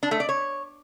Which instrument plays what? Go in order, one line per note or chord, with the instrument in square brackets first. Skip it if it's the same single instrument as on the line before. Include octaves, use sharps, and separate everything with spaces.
[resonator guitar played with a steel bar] D4
A3
D5
C#5